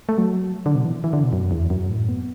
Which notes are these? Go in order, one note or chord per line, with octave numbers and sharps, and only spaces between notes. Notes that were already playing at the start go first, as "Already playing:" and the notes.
A3
F#3
D3
B2
E3
E3
D3
B2
F#2
E2
F#2
A2
B3